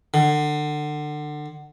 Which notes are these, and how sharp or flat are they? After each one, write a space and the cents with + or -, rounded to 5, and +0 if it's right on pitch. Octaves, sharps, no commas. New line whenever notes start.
D3 +30